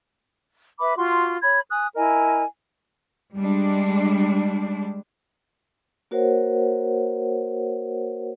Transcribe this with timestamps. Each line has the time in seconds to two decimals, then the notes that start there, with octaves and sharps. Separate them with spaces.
0.80 B4 E5 B5 D6
0.96 F4 F#4 C6
1.42 C#5 B5 G#6
1.70 G#5 D#6 F#6
1.96 E4 A#4 D#5 G#5
3.36 G3 G#3 D4
6.11 A#3 F#4 A#4 C5 C#5 F#5